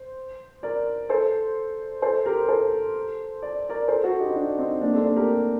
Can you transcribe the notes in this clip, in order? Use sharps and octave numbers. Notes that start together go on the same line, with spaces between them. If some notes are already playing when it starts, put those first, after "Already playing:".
Already playing: C5
A#4 D5
A4 C5
A4 C5
G4 A#4
A4 C5
D5
A#4 D5
A4 C5
F#4 A4
D#4 G4
D#4
D4 F#4
C4 D#4
A#3 D4
A3 C4
A#3 D4
G4 A#4